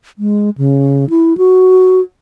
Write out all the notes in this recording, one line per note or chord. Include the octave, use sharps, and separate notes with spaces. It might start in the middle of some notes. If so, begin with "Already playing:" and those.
G#3
C#3
E4
F#4